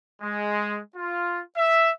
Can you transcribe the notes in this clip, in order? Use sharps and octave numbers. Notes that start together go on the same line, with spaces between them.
G#3
F4
E5